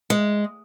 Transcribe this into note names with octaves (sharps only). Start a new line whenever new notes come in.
G#3